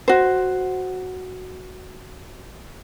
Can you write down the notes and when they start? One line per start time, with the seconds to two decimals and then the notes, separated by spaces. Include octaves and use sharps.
0.08 F#4 C5